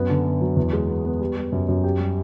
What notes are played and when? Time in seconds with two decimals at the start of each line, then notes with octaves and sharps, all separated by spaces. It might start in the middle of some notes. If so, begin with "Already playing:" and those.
Already playing: F#2 B3
0.10 D3
0.25 B3
0.41 F#3
0.56 E2
0.73 G#3
0.89 B3
1.05 B3
1.20 G3
1.36 G3
1.52 F#2
1.69 F#2
1.84 G4
2.00 G3